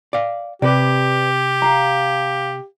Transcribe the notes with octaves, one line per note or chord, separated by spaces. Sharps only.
D5 F5
C3 G4 B4 D5
F5 A#5